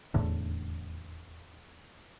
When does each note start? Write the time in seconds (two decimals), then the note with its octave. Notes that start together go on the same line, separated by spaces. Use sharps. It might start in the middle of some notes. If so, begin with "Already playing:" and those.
0.14 D#1 E2 A2 D3